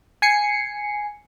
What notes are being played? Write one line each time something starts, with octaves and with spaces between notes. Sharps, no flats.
G#5 C7 C#7